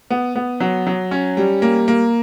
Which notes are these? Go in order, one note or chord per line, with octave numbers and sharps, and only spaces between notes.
B3
B3
F#3
F#3
C#4
G3
A#3
A#3